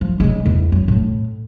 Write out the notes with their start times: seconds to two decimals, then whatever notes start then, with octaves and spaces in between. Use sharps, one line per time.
0.01 F3
0.20 C#3 G#3
0.46 E2
0.72 F#2
0.88 A2